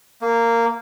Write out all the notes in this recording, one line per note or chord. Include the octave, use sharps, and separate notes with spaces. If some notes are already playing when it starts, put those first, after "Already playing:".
A#3